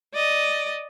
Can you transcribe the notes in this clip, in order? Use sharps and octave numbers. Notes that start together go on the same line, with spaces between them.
D5 D#5